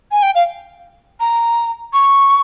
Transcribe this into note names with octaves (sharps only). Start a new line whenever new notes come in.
G#5
G5
F5
A#5
C#6